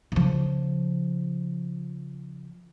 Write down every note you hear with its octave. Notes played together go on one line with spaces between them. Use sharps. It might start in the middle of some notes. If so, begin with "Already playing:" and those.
C#3 F3